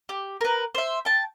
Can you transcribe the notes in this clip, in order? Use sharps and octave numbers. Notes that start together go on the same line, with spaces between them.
G4
A#4 B4
C5 E5
G5 A5